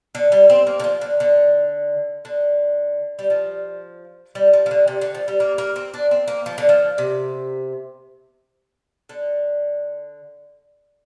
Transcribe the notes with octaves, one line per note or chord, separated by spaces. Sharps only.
D3
G3
C4
A#3
D3
F3
D3
D3
D3
G3
F3
G3
F3
F3
D3
C3
D3
F3
G3
A#3
A#3
C4
D4
C4
A#3
F3
D3
F3
C3
D3